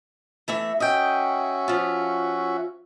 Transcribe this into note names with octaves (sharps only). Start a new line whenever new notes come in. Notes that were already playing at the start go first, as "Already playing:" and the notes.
E3 A3 E5
C#4 F#4 D#5 E5 G5
F3 F4